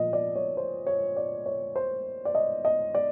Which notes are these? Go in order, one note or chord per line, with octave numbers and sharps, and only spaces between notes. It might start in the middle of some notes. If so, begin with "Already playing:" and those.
Already playing: A#2 F3 D#5
D5
C#5
C5
C#5
D5
C#5
C5
D5
D#5
D#5
D5